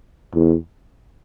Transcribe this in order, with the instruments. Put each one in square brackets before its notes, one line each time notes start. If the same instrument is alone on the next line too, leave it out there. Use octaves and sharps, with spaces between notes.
[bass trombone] E2